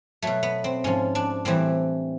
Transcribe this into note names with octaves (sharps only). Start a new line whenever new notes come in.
B2 F#3 A3
B3
C4
G#2 F3 C#4
D4
A2 E3 G3 C4